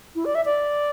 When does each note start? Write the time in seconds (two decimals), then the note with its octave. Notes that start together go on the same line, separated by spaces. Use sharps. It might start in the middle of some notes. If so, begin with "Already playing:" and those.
0.16 E4
0.25 D5
0.35 E5
0.45 D5